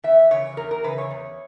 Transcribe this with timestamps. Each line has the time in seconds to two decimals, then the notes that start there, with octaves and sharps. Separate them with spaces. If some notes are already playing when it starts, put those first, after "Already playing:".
0.04 E2 E5
0.31 C#3 E3 C#5
0.57 E2 A#4
0.71 A#4
0.84 C#3 E3 B4
0.98 C#5
1.11 E2